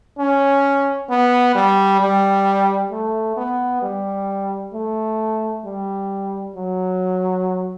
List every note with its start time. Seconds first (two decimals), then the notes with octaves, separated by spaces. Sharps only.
0.18 C#4
1.09 B3
1.55 G3
2.00 G3
2.91 A3
3.37 B3
3.82 G3
4.74 A3
5.65 G3
6.56 F#3